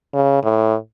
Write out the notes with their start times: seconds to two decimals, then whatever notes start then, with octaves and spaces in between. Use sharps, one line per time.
0.13 C#3
0.43 A2